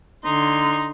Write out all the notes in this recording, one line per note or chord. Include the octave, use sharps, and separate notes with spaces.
D3 D#4 C6